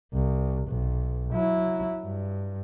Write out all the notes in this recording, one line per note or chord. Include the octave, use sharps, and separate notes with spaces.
C2
B1
F#3 E4
G2